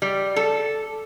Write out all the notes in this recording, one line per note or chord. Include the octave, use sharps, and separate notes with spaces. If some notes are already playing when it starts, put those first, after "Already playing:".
G3
A4